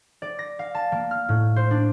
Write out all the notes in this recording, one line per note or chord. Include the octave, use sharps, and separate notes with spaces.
D5
A#6
F5
A5
A#3
F6
A2
C5
D4